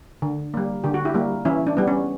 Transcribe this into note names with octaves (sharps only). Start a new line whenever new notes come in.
D3
G3 A#3
D3 G4
F#4
E4 G4
G3 A#3
E3 C#4 E4
D4
G3 B3
C#4